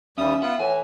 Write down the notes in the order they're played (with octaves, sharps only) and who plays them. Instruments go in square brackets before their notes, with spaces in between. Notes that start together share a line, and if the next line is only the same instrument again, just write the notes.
[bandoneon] D#2 G3 D#6 [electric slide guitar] C#4 [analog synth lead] E5
[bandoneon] B3 F4 [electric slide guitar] F#5
[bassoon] A2 [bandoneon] E3 [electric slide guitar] G#5